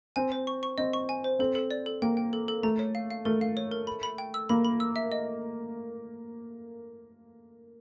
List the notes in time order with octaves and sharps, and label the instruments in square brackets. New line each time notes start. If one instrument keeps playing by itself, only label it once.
[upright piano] C4 [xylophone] G#5
[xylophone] C5
C#6
C#6
[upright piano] C4 [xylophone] D#5
[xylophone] C#6
G#5
C5
[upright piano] C4 [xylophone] A4
[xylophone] A4
D5
A4
[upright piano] A#3 [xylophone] G5
[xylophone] G5
A4
A4
[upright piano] A3 [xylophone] A#5
[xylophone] C#5
F5
F5
[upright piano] A3 [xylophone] A#4
[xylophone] F5
C#5
A#4
B5
B5
G5
E6
[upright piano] A#3 [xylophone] B5
[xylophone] B5
E6
E5
D#5